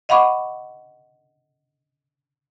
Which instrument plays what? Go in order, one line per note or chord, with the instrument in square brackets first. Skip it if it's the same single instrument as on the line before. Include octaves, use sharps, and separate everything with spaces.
[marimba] D#5 F5 F#5 B5 C#6 D6